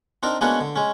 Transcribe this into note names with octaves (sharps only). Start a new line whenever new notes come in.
C4 D4 D#4 A#4
G#3 A#3 B3 C#4 D4 F#4
D3
G#3 C#4